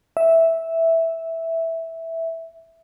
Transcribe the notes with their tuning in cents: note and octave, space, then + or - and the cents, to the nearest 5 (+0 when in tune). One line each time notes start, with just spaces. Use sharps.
E5 -5